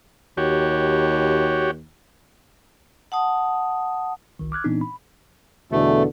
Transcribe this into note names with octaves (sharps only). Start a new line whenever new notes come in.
D#2 F#4 G4 C#5
F#5 A5 D#6
G1 C2 D#3
D6 F6 F#6 G#6
A#2 E3 B3 C4 D4 D#4
B5
E2 B2 D3 A3